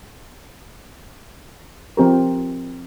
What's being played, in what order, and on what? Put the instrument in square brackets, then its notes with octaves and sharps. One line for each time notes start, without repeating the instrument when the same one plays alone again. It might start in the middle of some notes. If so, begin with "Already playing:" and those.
[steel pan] F3 C4 G4 A#4